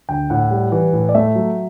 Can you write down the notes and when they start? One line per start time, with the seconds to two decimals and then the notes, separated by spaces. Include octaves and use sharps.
0.09 D2 G5
0.30 A2 F#5
0.51 G3
0.72 E3
0.93 A2
1.09 D5
1.15 A3 E5
1.35 F#3